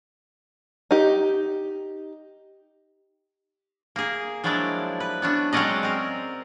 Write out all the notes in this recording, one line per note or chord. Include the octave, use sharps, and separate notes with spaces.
D#4 G4
A#3 G#4
F3 F#3 G#3 D4 E4 D5
B4
B3 C#4 D4
F#3 G#3 C4 C#4 D5 D#5
C4 A#4